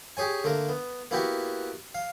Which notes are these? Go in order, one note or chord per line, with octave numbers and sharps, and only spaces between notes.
G4 G#4 C#5 G#5
D3 A3 A#3 A#4
B3
A#3 B3 E4 F#4 G4 F#5
F5